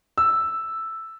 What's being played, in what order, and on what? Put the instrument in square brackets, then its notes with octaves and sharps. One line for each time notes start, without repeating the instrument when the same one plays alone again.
[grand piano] E6